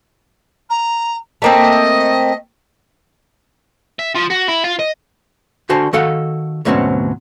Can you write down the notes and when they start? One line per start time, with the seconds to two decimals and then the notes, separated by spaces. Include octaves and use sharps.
0.69 A#5
1.42 A3 A#3 C4 D#5
3.99 E5
4.16 F3
4.31 F#4
4.48 E4
4.64 F4
4.79 D#5
5.69 D3 F#4 C5 G#5 A5
5.93 D#3 F#4 A4 F5 F#5
6.65 D2 G#2 B2 F#3 C4 C#4